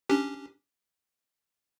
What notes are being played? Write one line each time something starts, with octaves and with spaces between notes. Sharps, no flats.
C#4 D4 G4